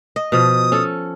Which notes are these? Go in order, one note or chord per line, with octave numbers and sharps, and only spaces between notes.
D#5
B2 F3 D#6
C#4 A4